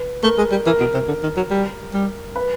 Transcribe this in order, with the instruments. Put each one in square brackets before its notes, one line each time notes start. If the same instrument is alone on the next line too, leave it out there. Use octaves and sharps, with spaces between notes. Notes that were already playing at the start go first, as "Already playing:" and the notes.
Already playing: [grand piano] B4
[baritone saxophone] A3 [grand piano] A#4
[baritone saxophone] G#3
G3
[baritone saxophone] E3 [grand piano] A#4
[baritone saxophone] B2
C3
D3
D#3
F#3
G3
G3
[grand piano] B4